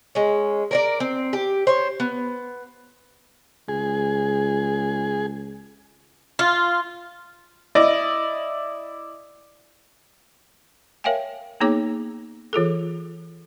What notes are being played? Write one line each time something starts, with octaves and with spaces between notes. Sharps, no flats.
G#3 C#4
A#4 C#5 D5
C4
G4
C5 C#5
B3
C#2 G#4
F4
E4 D5 D#5
A#4 C#5 E5 F5 G5 G#5
A#3 B3 D#4 G#4 C#5 D6
E3 F4 G#4 A4